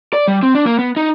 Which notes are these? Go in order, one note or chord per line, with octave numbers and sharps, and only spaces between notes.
D5
G3
C4
D4
A#3
B3
D#4